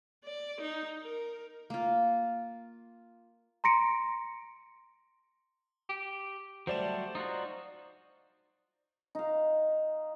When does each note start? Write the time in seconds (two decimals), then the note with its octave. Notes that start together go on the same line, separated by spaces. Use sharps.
0.25 D5
0.61 D#4
1.02 A#4
1.70 A#3 F4
3.64 A#5 C6 A#6 C#7 D7
5.89 G4
6.67 F#3 G3 A3 C5 D5 E7
7.15 D#4 F4 F#4
9.15 D#4 F5